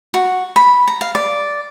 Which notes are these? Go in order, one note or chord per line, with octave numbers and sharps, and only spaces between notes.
F#4
B5
A#5
F5
D5